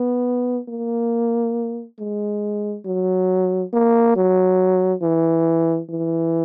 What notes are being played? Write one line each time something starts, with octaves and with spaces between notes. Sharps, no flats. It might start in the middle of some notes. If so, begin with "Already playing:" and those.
Already playing: B3
A#3
G#3
F#3
A#3
F#3
E3
E3